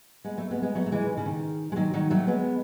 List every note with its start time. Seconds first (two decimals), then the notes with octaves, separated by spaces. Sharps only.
0.24 G#3 B3
0.37 F#3 A3
0.51 G#3 B3
0.62 G#3 B3
0.75 F#3 A3
0.86 A3
0.92 E3 G#3
1.09 D#3
1.17 C#3
1.26 D#3
1.72 G#3
1.76 D#3 F#3
1.94 D#3 F#3
2.10 F#3 A3
2.27 G#3 B3